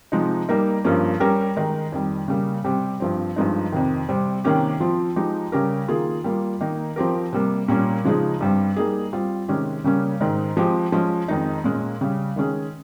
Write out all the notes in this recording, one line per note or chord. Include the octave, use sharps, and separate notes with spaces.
C3 F3 G#3 D#4
G3 A#3 D#4 A#4
G2 F3 A#3 C#4
G3 C#4 G4 A#4
D#3 G#3 D#4 A#4
F2 D#3 G3
C#3 G3 A#3
C3 G3 C4 G4
G2 F3 C4
G2 F3 G#3 D#4
F2 C3 D#3
C3 G3 C4
C3 D#3 A#3 C#4 G4
F3 C4 F4
F3 G#3 D#4 G4
C#3 G3 C#4 G4 A#4
D#3 A#3 F4 G#4
G3 A#3 F4
D#3 A#3 D#4
F3 C4 G4 A#4
C3 G3 A#3
A#2 G3 C#4
C#3 F3 G#3 D#4 G#4
G2 G3 C4
G3 A#3 D#4 G#4
G3 C4 F4
C3 D#3 G#3 C#4 G4
C#3 G3 A#3 C#4
G#2 D#3 G#3 D#4
F3 G#3 C4 G4
F3 G#3 C#4
F2 D#3 G#3 D#4
A#2 G#3 C#4
C#3 G3 C#4
D#3 G#3 C#4 G#4